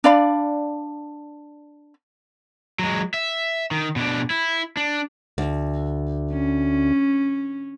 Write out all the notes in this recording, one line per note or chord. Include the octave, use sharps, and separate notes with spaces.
D4 D5 F5 B5
F#3 G#3
E5
D#3
B2 D4
E4
D4
D2
C#4